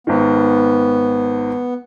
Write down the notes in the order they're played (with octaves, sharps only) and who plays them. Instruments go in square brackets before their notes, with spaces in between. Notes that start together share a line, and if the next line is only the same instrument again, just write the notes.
[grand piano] G#1 D#3 [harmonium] B3